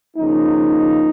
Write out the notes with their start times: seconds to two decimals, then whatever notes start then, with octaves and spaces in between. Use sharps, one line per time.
0.17 C#3 F3 A#3 D#4